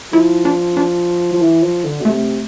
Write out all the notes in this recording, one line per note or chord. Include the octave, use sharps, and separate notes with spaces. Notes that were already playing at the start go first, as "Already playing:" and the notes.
F3 E4
D4
D4
F3
E3
F3
D3
B2
C3 A3